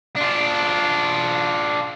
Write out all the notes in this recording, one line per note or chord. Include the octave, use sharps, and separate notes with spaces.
D4 F4